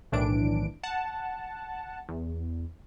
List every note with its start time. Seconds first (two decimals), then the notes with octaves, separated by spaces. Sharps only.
0.12 B1 A2 D#3 E3 D4 D7
0.83 F#5 A5
2.09 E2